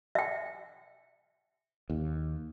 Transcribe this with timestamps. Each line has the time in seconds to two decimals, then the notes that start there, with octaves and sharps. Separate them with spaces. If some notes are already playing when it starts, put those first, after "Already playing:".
0.15 E5 G5
1.90 D#2